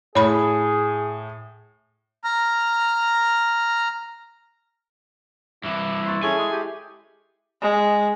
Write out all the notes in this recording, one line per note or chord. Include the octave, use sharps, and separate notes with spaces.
A2 G#4 C#5 B5
A#5 F6
G2 E3 E4
C6 C#6 A6
C#4 E4 G#4 A4 G#5
G#3
G4
G#3